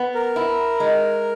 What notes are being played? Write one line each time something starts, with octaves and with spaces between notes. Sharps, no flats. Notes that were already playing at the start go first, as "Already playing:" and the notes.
Already playing: B3
A#4
E4
G#3